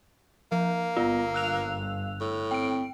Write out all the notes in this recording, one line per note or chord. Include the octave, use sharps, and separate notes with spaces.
F3 A#3
G1 B3 F4
F5 E6 F#6 F7
A2
C4 G5 D7